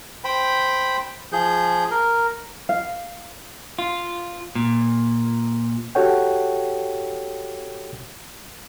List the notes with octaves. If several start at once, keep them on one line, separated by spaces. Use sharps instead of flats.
C5 G5 B5
F3 G#4 G6
A#4
F5
F4
A#2
F#4 G4 A4 C#5 F#5 G5